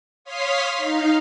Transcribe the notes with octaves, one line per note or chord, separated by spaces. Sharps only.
C#5 F5 C6 D#6 F6 B6
D#4 F5